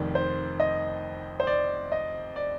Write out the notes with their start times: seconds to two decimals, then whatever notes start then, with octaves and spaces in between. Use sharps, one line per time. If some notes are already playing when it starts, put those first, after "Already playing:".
Already playing: F1 F2 D#3 D5
0.15 C5
0.60 D#5
1.40 C5
1.47 D5
1.92 D#5
2.36 D5